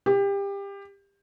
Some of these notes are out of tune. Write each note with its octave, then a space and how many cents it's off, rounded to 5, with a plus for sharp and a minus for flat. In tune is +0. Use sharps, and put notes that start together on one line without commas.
G4 +25